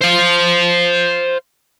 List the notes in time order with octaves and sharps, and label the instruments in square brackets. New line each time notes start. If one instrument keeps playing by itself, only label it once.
[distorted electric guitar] C5 F5